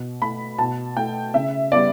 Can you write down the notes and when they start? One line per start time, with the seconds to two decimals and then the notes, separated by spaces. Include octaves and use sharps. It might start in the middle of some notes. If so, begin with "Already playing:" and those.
Already playing: B2
0.21 A3 B5
0.59 B2 A5
0.97 A3 G5
1.34 C#3 E5
1.72 G3 B3 D5